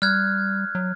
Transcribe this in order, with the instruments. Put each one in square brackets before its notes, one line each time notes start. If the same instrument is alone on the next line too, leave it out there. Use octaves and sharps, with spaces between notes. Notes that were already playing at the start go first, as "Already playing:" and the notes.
[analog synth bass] G3 [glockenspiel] F6 F#6 G#6
[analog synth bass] F#3